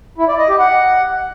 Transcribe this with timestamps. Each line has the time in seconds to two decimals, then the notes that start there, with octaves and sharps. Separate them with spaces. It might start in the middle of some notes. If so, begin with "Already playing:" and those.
0.18 E4
0.28 D5
0.38 D#5
0.49 G4
0.59 F#5